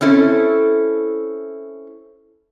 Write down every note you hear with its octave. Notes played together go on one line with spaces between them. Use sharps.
C4 C#4 E4 A4